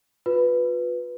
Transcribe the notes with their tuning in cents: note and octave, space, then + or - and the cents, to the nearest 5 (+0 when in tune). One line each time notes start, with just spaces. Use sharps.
F4 +40 B4 +0